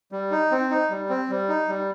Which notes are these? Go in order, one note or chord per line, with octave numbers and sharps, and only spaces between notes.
G3
D#4
C4
D#4
G3
C4
G3
D#4
G3